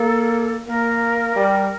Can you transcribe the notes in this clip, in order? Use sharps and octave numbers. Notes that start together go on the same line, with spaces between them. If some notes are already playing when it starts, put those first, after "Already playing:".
Already playing: A#3 A4
A#3 A#4
G3